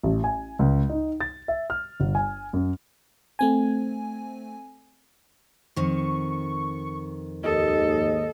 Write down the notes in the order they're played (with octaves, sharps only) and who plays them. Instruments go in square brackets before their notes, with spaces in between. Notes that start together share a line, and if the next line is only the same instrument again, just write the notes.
[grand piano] A1
G#5
C#2
D#4
A6
E5
F6
G1
G#5
F#2
[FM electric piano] A3 C4 G#5
[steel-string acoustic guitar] F2 D#3 [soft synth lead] C#6
[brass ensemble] D#2 G#2 [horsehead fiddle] A4 [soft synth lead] D#5